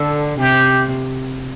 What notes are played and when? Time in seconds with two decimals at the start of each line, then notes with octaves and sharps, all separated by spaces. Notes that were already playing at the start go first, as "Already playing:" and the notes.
Already playing: D3 A4
0.38 C3 G4